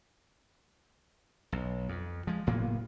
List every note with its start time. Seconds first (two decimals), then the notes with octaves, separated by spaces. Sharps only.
1.52 B1
1.89 F2
2.27 F3 G#3
2.47 F#1 A2 A#3 B3